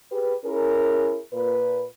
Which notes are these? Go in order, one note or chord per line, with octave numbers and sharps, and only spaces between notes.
G4 G#4 B4
C#4 E4 G#4 A#4
A#2 B4